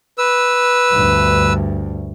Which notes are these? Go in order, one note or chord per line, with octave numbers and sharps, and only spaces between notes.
B4 E6
D2 G2